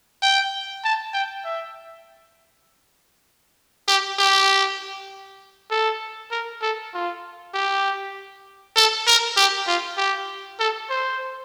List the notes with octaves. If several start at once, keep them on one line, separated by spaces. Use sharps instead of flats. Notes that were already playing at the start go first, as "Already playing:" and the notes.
G5
A5
G5
E5
G4
G4
A4
A#4
A4
F4
G4
A4
A#4
G4
F4
G4
A4
C5